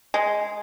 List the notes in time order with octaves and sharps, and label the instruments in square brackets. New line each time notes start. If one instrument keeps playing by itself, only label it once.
[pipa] G#3